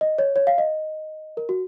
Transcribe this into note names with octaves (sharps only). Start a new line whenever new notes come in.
D#5
C#5
C#5
F5
D#5
A#4
F#4